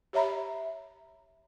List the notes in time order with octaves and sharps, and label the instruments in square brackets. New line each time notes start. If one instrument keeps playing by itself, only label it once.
[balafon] G4 C#5 E5 A#5 B5